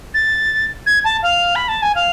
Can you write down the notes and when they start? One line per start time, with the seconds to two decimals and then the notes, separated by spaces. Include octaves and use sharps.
0.14 A6
0.86 G#6
1.04 A5
1.23 F5
1.55 B5
1.68 A5
1.82 G#5
1.95 F5